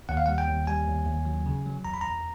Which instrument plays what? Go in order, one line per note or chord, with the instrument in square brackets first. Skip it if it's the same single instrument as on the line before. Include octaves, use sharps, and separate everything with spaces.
[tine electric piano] D#2 F#5
F5
G3 F#5
G5
D#2
G3 G#5
D#2
D#2
F#3
C#3
F#3
E2 A#5
B5
E2 A#5